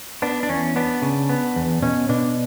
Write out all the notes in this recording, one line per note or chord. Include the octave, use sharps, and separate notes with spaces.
B3 D4
D4
E2 C#4
B3 D4
C#3
B3
E2
B2 C#4
B2 D4